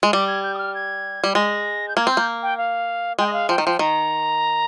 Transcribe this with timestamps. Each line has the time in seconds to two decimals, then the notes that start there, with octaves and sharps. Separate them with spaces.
0.03 G#3
0.08 C6
0.13 G3 D6
0.28 G#6
0.43 G6
0.54 D#6
0.58 F6
0.75 G#6
1.24 G3
1.35 G#3 A#6
1.88 G6
1.96 A#3 G#6
2.06 C4 F6
2.12 G6
2.17 A#3
2.43 G5
2.58 F5
3.19 G#3 G5
3.27 D#5
3.33 F5
3.49 F3 G5
3.58 D#3
3.65 F3 G5
3.79 D#3 A#5